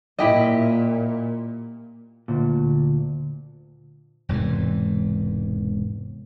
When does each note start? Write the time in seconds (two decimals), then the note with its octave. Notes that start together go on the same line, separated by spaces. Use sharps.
0.19 A#2 E4 G4 D#5
2.28 D2 A#2
4.29 E1 G#2 C3 E3